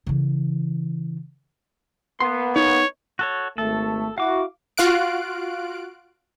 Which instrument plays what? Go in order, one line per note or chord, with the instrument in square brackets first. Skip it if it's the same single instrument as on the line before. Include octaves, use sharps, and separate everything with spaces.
[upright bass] C#3 E3
[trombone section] A#3 B3 [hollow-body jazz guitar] C6
[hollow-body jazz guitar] D#4 [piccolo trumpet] C#5
[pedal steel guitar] F#4 A4 C#5
[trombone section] G#1 A3 [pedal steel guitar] A4
[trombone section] E4 F#4 [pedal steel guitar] F5 D6
[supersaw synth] F4 F#4 F5 F#6 D7